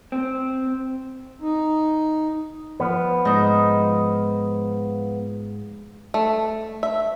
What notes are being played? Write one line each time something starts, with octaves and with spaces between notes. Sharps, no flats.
C4
D#4
F3 B3 B4
G#2 D#4
A3
E5